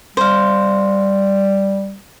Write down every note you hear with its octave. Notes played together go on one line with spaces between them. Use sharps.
G3 C5 F5